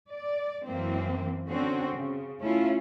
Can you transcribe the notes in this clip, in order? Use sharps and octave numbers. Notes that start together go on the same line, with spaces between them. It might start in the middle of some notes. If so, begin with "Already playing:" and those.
D5
F#2 E3 A#3 C4
D3 C4 C#4 F#4
C#3
A3 C#4 E4 F4